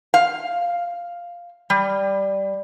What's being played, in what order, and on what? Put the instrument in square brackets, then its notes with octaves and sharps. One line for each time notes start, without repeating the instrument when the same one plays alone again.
[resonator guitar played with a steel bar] F5
G3